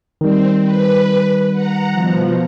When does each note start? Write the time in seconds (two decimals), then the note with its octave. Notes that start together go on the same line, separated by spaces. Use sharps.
0.21 D#3 G3 C4
0.63 B4
1.52 F#5 A#5
1.91 B2 F3